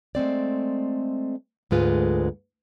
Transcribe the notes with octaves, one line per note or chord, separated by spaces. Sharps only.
G#3 A3 C4 D5
D2 G#2 G#3 F4 B4